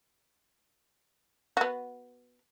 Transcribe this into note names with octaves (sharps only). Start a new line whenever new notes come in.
B3 F#4